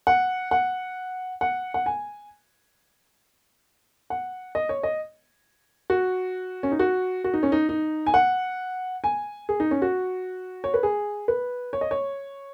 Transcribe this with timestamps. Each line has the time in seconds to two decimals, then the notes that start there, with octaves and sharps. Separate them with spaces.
0.07 F#5
0.51 F#5
1.41 F#5
1.74 F#5
1.86 G#5
4.10 F#5
4.55 D#5
4.69 C#5
4.83 D#5
5.90 F#4
6.63 C#4
6.72 D#4
6.79 F#4
7.24 F#4
7.34 D#4
7.43 C#4
7.52 D#4
7.69 D#4
8.07 G#5
8.14 F#5
9.04 G#5
9.49 G#4
9.60 D#4
9.71 C#4
9.82 F#4
10.64 C#5
10.74 B4
10.83 G#4
11.28 B4
11.73 C#5
11.81 D#5
11.91 C#5